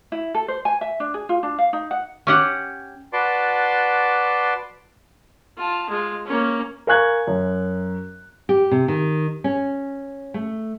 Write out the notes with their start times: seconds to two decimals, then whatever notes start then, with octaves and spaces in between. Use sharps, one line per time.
0.12 E4
0.34 A4
0.48 C5
0.65 G#5
0.81 E5
1.00 D4
1.14 G#4
1.29 F4
1.43 D4
1.59 F5
1.73 D#4
1.91 F#5
2.27 C#4 G4 F#5
3.13 F#4 B4 D5 A5 C6 D6
5.57 F4 A5
5.90 G#3 F4
6.26 A#3 C#4
6.87 A#4 F5 G#5 C#6 F#6 G#6
7.27 F#2
8.49 G4
8.71 C3
8.88 D#3
9.44 C#4
10.34 A3